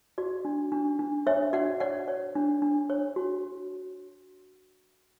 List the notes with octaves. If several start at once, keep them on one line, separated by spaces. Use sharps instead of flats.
F#4 D5
D4
D4
D4
D4 C#5 E5
F#4 D5 F#5
C#5 D5 F#5
C#5
D4
D4
C#5
F#4